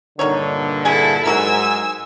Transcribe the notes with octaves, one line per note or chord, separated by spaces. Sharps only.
G2 A#2 D3 D#3 D#4 C#5
E4 G#4 A4 G#5
G#2 F#3 F#4 A#4 G#5 E6